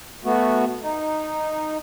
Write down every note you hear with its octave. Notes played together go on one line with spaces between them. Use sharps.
A3 B3 F#4
D#4